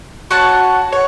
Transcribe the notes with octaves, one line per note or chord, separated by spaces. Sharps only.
F#4 C#5 F#5 A5
C#5